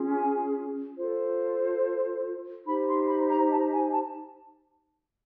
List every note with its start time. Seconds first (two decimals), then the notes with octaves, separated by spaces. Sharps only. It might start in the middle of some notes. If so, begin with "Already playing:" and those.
Already playing: C#4 F4 G#4
0.14 G#5
0.98 F4 A4 C5
2.66 D#4 G4 C5 B5
2.87 C6
3.08 B5
3.29 A#5
3.51 A5
3.72 G#5
3.92 A5